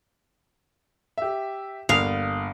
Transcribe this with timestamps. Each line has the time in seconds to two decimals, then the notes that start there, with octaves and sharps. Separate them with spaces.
1.18 G4 E5
1.89 G1 A#3 F5 D#6